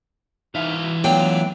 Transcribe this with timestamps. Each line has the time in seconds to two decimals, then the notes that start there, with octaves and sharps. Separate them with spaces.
0.55 E3 D#4 E5 F5
0.84 F#4
1.04 F#3 A3 B3 D4 F4 G5